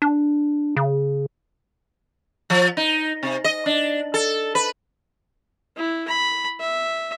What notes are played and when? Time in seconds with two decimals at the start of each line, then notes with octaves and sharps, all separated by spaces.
0.02 D4
0.76 C#3
2.50 F3
2.77 D#4
3.23 C3
3.44 D#5
3.66 D4
4.14 A4
4.55 B4
5.77 E4
6.07 B5
6.59 E5